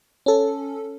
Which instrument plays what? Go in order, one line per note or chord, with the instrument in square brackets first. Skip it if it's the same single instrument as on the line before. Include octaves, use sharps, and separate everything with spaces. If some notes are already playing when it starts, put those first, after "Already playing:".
[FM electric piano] C#4 A4